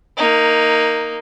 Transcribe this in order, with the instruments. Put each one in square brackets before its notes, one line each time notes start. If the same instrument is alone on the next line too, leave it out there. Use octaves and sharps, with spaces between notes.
[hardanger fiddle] A#3 D#4